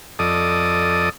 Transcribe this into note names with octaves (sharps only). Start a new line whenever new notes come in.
F2 A4 D5 D#5 D#6